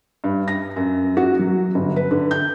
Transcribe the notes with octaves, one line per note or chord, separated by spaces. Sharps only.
G2
A#6
F#2
F#4
F#3
G1
B4
D3
G6